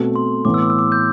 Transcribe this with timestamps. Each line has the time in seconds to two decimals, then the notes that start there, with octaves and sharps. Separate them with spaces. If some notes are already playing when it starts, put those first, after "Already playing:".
Already playing: B2 A3 C4
0.16 C6
0.45 A2 E3 B3 D6
0.54 E6
0.62 D6
0.70 E6
0.79 D6
0.92 G6